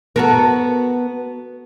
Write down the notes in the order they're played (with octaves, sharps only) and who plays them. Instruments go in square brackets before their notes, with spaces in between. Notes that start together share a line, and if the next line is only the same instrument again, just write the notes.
[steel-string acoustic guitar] B3 [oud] F#4 A4 A#4